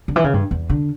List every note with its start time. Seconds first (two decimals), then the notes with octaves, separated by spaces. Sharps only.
0.08 D3
0.16 E3
0.24 C#3
0.34 G2
0.51 E2
0.70 D3